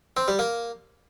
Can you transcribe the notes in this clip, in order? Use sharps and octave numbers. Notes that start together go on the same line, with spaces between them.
C4
G3
A#3